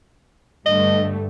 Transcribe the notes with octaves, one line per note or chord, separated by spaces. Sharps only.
G2 D3 A3 D#5